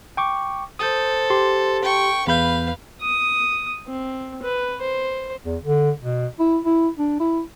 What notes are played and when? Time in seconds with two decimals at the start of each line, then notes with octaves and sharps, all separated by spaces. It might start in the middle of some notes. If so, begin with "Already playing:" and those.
0.17 G5 C#6 D6
0.79 A4 C5 D#6 G6
1.30 G4 C6
1.83 G5 C#6
2.27 E2 B4 F5 B5 G6
3.01 D#6
3.87 C4
4.42 B4
4.81 C5
5.45 E2
5.63 D3
6.02 B2
6.39 E4
6.65 E4
6.97 D4
7.20 E4